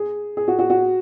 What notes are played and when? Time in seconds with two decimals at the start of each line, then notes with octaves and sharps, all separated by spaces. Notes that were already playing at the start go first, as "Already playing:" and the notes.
Already playing: G#4
0.37 G#4
0.48 F#4
0.59 F#4
0.70 F#4